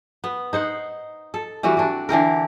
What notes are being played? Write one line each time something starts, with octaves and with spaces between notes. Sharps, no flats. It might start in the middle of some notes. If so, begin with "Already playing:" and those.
B3
D#4 C5 F#5
A4
E3 G3 C4 F#4
D4 F#4
D3 E3 C4 A#4